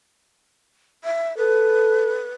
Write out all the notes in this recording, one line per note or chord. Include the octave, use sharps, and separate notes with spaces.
E5
A4 B4